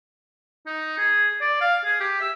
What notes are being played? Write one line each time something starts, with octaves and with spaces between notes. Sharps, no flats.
D#4
G#4
D5
F5
G#4
G4
E5